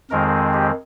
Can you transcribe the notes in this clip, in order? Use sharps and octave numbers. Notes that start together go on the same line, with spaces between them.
F2 D#3 G#3 C4 A#4
G4